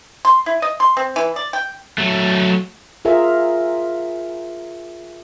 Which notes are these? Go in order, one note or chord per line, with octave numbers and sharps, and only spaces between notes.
C6
E4
D#5
C6
C4
E3
D5
G5
F#3 A3
F4 G#4 A#4 E5